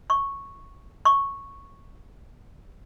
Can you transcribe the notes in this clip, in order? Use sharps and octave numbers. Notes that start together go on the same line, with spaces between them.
C#6
C#6